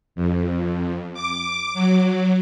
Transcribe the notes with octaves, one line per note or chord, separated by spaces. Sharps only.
F2
D6
F#3